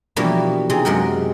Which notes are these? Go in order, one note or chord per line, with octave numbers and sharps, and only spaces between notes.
B2 E3 F3 G3 A#3 D4
C3 C4 D#4 G#4
F#2 C3 G#3 A#4 F#5 G5